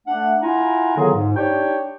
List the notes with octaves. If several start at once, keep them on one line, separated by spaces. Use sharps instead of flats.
A3 D4 F#5
E4 F4 F#5 G#5 A#5
D3 D#3 F#3 B3 F4 G#4
G#2
D4 D#4 G4 C#5 D5 G5